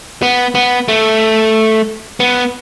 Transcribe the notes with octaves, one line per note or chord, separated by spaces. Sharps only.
B3
B3
A3
B3